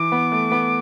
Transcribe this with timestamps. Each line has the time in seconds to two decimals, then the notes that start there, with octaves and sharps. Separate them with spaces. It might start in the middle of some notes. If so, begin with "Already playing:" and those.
Already playing: E3 D6
0.12 B3
0.32 A3
0.51 B3